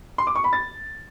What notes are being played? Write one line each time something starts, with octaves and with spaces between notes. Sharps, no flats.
C6
D6
C#6
B5
A6